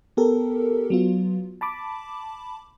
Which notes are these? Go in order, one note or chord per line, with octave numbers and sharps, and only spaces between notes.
B3 G4 A4 A#4
F#3 B3 F4
A5 B5 D6